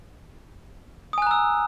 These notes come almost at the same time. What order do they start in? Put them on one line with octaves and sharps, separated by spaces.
D#6 G#5 F#6 A#5 E6